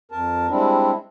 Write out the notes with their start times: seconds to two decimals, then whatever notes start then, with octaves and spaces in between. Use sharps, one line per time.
0.11 F2 A#4 A5
0.50 G3 G#3 C4 D4 E4